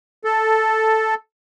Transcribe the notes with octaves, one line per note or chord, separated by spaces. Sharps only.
A4